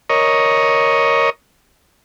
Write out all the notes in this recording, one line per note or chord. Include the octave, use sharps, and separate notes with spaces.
A#4 C#5 D#5